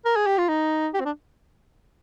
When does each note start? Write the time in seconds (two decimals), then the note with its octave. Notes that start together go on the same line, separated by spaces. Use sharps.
0.05 A#4
0.16 G#4
0.26 G4
0.38 F4
0.48 D#4
0.93 G4
1.00 C4
1.05 D4